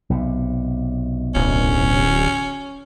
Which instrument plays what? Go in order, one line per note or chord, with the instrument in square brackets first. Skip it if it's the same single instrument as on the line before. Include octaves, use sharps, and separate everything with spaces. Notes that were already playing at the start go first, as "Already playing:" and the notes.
[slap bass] B1 C3
[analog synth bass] D1 [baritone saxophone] C#4